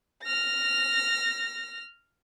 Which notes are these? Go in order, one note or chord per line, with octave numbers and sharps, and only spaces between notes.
F6 A#6